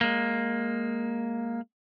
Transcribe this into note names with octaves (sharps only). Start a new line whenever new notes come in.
G#3 A#3